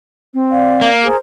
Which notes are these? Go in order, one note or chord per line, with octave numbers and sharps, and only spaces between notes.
C4
D5 F5
A#3
G#4 A#4 C5